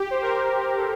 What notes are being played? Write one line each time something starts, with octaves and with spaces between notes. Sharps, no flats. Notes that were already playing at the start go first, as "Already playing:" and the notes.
Already playing: G4
C5
A#4
C5
A4